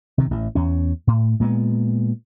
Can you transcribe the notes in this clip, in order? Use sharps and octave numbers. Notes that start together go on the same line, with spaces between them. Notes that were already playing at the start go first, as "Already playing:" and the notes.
C3 D#3
A1
E2 C#4
A2
A#2 G#3 A3 B3